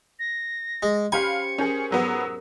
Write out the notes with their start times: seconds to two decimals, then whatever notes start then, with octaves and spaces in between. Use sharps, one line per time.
0.19 A#6
0.83 G#3
1.12 C#4 G4 C5 F5 G#5 B5 C#7
1.58 C#4 G#4 A#4 G6
1.90 G#2 F#3 B3 E6